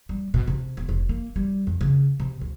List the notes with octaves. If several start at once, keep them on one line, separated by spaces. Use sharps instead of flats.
G3
B2
C3
E1
F1
A#3
G3
F2
C#3
C3
D2